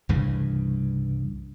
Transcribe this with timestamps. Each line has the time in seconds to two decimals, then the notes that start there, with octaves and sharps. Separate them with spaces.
0.09 C2 G2 C#3 E3